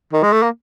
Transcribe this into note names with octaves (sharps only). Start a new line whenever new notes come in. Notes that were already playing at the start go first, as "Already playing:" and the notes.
D#3
G#3
A3
A#3